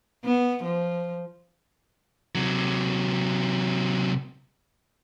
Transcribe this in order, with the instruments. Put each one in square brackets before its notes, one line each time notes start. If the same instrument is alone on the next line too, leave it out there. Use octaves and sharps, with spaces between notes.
[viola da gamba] B3
F3
[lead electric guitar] C3 F#3